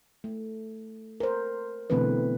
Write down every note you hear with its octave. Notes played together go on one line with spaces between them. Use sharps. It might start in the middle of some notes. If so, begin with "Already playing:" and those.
A3
A#4 C5
B2 D3 E3 A3 C4 B4